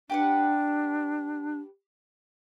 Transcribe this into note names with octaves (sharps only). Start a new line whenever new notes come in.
D4 G4 B4 F#5